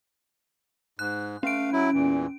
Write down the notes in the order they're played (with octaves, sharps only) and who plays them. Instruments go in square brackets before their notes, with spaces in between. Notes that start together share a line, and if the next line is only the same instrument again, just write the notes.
[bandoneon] G#2 [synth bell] F#6
[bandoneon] A3 F5 [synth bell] C#4 D7
[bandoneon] F#3 E4
E2 A#2 E3